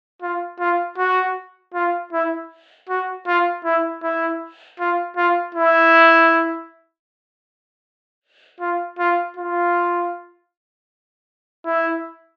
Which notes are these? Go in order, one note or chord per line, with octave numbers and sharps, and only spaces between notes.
F4
F4
F#4
F4
E4
F#4
F4
E4
E4
F4
F4
E4
F4
F4
F4
E4